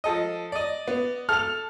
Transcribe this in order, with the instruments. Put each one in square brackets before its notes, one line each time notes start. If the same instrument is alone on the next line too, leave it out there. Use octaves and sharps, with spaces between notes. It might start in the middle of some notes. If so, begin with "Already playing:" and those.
[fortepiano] F3 A4 D#5
D5 D#5
[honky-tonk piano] B3
[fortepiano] A4 [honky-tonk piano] F6 F7